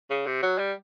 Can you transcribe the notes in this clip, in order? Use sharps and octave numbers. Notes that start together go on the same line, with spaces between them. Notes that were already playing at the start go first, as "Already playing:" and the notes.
C#3
C3
F#3
G3